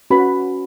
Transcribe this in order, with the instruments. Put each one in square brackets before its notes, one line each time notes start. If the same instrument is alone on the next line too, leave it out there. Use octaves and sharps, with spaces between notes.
[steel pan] C#4 F#4 B4 B5